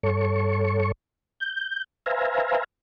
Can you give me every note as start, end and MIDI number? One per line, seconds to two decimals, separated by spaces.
0.03 0.92 43
0.03 0.92 69
0.03 0.92 73
0.03 0.92 85
1.40 1.84 91
2.06 2.64 71
2.06 2.64 72
2.06 2.64 76
2.06 2.64 77
2.06 2.64 80
2.06 2.64 82